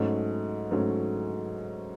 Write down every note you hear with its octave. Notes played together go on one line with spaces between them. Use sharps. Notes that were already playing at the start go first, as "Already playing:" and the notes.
Already playing: G#2 F#3 A3 C#4
G#2 F#3 A3 C#4